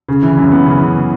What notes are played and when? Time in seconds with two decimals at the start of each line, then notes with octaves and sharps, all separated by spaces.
0.08 C#3
0.23 E3
0.37 F#2
0.52 B3
0.66 C#3
0.81 E3